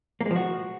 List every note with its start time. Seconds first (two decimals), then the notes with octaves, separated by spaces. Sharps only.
0.21 A#3
0.26 G#3
0.31 F3
0.36 F#4